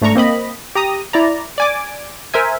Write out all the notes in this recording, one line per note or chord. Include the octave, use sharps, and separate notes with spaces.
G#2 A3 D4 A#5 C#6
A#3 C4 D#5 B5
G4 A#5 D#6
E4 D5 A#5
D5 G#5 D6
A#4 C5 E5 G#5